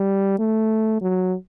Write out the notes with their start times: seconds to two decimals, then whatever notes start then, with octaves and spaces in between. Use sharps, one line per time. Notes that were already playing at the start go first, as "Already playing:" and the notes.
Already playing: G3
0.39 A3
1.02 F#3